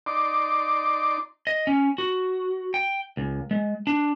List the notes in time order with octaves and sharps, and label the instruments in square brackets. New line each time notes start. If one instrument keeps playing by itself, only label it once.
[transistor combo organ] D#4 D5 C6 D6
[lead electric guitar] D#5
C#4
F#4
G5
C#2
G#3
D4